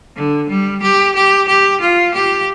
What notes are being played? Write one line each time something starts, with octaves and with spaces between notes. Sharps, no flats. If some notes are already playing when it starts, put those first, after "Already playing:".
D3
G3
G4
G4
G4
F4
G4